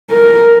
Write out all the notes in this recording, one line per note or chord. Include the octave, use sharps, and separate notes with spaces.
A#4